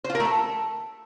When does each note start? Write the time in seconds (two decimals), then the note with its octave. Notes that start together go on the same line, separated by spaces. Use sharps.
0.04 C5
0.10 F4
0.15 A#4
0.20 A3
0.25 A4